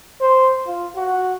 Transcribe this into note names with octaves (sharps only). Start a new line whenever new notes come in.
C5
F4
F#4